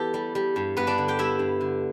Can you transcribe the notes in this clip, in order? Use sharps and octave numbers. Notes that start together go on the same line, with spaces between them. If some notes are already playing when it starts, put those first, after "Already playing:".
Already playing: E3 B3 E4 G4 A4
G3
G3
G2
G2 B3 B4
D4 D5
D3
G4 G5
G3 E4 E5
G2
D3